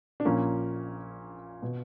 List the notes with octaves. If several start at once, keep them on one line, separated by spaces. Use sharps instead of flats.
D4
A#1 A#2 A#3 C#4
B2